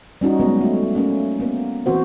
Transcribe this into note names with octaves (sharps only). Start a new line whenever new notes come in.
G3 C#4 D#4 F#4
F#3 G#3 B3
A3 F#4
A3 A#3 C#4
A#3 B3
E3 A#3 C4 F#4 C5